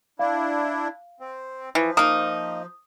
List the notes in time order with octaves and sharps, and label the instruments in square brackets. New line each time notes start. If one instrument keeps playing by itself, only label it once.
[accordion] D4 E4 [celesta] F5
[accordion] C4
[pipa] E3 [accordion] F3
[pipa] A#3 D#4 [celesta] D#6